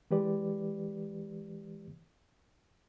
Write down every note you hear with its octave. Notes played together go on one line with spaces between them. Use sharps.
E3 G#3 G4 B4 D5